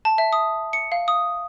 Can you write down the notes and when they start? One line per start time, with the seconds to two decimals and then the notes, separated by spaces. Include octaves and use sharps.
0.05 A5
0.18 E5
0.33 D#6
0.73 C#7
0.92 F5
1.08 D#6